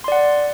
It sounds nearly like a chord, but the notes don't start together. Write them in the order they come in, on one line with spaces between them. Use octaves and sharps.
C6 D5 F#5